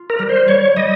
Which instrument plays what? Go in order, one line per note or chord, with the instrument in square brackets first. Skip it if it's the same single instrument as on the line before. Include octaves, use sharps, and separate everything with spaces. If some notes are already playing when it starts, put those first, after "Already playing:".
Already playing: [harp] F4
[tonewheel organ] A#4
[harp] G3
[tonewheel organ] C5
[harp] G3 [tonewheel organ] C#5
[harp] G3 [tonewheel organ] D#5